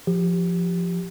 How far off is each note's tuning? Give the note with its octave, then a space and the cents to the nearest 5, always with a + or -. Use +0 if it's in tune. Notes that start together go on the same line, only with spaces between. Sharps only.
F3 +0 G4 +0